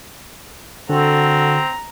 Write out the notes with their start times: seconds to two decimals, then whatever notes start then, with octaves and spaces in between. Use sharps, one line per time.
0.90 D3 C4 F#4 A4 A#5